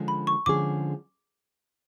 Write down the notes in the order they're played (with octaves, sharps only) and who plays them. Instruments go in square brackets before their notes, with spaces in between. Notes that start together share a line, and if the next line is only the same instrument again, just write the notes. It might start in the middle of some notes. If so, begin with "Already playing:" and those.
Already playing: [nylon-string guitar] D3 F3 G#3 C#4 G#4
[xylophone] B5
C#6
[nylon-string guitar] D3 F3 G#3 C#4 G#4 [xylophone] D6